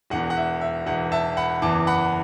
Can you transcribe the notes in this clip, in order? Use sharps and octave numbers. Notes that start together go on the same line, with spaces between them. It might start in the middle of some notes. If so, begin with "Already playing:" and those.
E1 E2 E3 F#5
F#5
E5
E5
E1 E2 E3 F#5
E5 A5
F#5 B5
F#1 E2 E3 A5 D6
F#5 B5